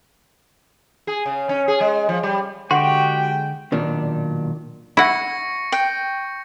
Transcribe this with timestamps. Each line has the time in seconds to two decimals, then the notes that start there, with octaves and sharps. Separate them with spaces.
1.07 G#4
1.26 C#3
1.49 C#4
1.68 G#4
1.81 G#3
2.09 F3
2.23 G3
2.71 D3 G#3 F#4 G4 F#5 G5 C6
3.72 B1 A#2 D#3 D4
4.97 E4 F#5 C#6 A#6 C#7
5.72 G5